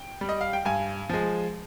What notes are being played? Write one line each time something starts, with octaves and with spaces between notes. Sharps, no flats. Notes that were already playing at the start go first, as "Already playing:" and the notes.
Already playing: G5
G3
D#5
F5
G5
G2 G#5
F3 G#3